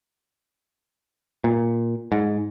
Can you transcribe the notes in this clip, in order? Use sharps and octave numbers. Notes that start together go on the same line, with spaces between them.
A#2
G#2